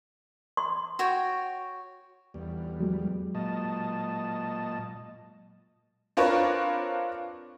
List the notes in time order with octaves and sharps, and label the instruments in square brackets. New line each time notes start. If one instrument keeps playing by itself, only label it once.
[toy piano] C6
[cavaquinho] F#4 C#5 G5
[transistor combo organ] E2 G3
[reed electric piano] F#3 G#3
[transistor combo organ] A#2 D#5 A5
[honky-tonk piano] C4 D4 F4 A#4 B4 C#5